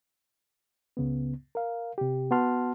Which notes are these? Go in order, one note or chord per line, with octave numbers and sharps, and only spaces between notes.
C#2 C#3 B3
A#4 F5
C3 G4
B3 F#4 F#5 A5 C6 F6